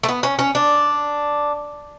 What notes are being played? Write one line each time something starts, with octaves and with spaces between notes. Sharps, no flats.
A3
B3
C#4
C#4
D4